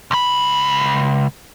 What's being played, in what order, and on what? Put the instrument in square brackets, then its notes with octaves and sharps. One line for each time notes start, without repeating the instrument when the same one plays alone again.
[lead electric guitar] C#2 B5